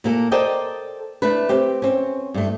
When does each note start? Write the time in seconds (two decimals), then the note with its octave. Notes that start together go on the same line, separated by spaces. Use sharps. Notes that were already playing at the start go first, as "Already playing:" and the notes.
0.04 A#2 A#3 A4
0.32 A4 A#4 C5 D5 D#5 G5
1.22 A3 D4 B4
1.49 C4 G4
1.82 C4 C#4
2.34 G2 A3